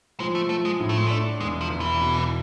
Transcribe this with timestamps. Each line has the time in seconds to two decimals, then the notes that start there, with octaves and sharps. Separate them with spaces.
0.20 F3 G#3
0.35 A3
0.49 F3 A3
0.65 G#3
0.80 A2
0.89 A3
0.97 G#3
1.07 A3 D4
1.40 E1 G#3
1.61 F3
1.70 E1
1.80 E3
2.01 B2